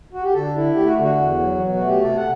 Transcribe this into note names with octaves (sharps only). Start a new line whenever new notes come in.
F#4
G4
D3 A4
E4
A3 G4
F#4
D3
F#4
E2
F#3
B2
F#4
A3
G4
C3 A4
F#5